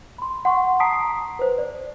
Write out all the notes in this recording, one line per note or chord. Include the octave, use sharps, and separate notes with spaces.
B5 C6
F#5 C6 C#6
A5 A#5 D#6 B6 C7 D7
B4 C5
D5